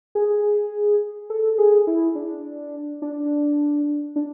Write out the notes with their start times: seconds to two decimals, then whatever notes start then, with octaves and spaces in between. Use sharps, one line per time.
0.15 G#4
1.30 A4
1.58 G#4
1.87 E4
2.15 D4
3.02 D4
4.16 D4